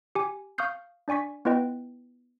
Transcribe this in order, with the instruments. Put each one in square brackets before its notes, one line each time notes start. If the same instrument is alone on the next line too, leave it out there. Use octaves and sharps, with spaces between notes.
[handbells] G4 G#5
F5 C#6 D#6 F6 G6 C7
D4 D5 G#5 C#6 B6
B3 E4 F4 B4 D#5 G5